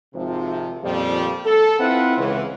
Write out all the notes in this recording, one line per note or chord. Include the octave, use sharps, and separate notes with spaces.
G#1 C3 F3
F2 A#2 C#3 F3 G3
A4
C4 E4 F4 B4 E5 F#5
C#2 C#3 E3